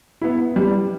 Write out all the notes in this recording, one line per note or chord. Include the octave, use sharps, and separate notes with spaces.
B3 E4
G3